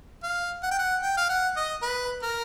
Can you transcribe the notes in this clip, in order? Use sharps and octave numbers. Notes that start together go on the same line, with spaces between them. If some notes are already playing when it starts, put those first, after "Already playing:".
F5
F#5
G5
F#5
G5
F5
F#5
D#5
B4
A#4